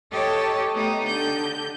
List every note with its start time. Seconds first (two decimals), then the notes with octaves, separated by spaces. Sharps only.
0.11 G4 A4 C#5 D#5 G5 A5
0.74 A3 B3 D#4 G4
1.05 D3 G6